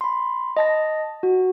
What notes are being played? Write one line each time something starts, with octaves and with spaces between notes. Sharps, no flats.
B5 C6
D#5 A5 A#6
F#4